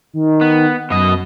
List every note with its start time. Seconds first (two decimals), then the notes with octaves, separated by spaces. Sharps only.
0.14 D#3
0.41 B3
0.90 F#2 B2 D#5